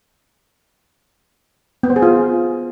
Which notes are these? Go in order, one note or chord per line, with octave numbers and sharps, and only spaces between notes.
B3
C5
G#4
F4